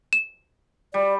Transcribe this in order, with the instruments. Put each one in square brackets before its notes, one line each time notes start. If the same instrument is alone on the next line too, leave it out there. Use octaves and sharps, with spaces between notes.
[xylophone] E7
[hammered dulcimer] G3 [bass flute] D5